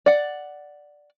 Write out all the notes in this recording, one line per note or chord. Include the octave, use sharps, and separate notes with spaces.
D5 F#5